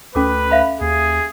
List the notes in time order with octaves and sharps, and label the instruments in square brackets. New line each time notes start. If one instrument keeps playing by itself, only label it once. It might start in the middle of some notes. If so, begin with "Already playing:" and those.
[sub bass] D2 [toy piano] C#4 A4 D6 [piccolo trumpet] B4
[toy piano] E5 F5 B5
[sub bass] D#2 [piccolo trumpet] G#4